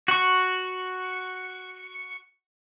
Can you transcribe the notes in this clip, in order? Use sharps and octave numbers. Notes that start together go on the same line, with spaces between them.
F#4 C#6